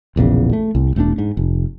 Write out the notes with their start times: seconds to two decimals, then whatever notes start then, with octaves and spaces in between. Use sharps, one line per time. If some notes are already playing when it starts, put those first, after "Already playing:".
0.16 E1 A#1 E2 C#3
0.53 A3
0.75 C2
0.96 E1 A3 C4 D4
1.18 G#2
1.37 F1